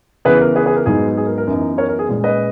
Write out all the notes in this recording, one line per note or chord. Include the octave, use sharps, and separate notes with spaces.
C#3 E3 B3 G#4 B4
A#4
G#4 B4
G#4 B4
A#4
G#2 F#3 B3 D#4 G#4
G#4
A#4
A#4
F#2 E3 B3 D#4
A#4 C#5
A#4
G#4
A#2 G#3 C#4
B4 D#5